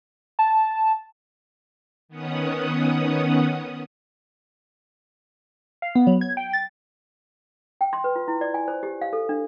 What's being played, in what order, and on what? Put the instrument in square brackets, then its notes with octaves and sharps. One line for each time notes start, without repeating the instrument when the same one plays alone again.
[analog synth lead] A5
[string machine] D#3 B3 C#4 F#5 D#6
[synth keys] F5
B3
F#3
G#6
G5
A6
[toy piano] G5
C6
B4
F4
E4
D5
G#5
C5
G4
F5
A4
D4